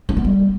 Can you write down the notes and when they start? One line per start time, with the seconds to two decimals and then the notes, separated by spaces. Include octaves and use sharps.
0.09 D4
0.17 B3
0.25 G3